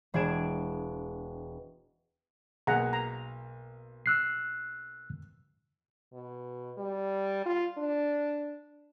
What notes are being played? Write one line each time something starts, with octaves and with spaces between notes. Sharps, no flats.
E1 D4 G#4 G#6 D7 E7
B1 A#3 G#4 F#5 A#5
A#5
E6 F#6 C7
B2
G3
F4
D4